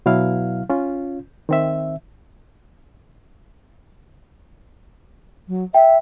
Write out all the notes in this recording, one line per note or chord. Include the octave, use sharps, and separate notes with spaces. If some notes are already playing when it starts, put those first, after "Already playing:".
B2 F#3 E4 F5 F6
C#4 F4
D#3 C4 E5
F#3
E5 G5